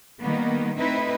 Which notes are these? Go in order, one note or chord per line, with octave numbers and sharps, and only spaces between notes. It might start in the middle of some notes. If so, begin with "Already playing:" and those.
D#3 G3 A#3 B3
A3 C4 D#4 E4 B4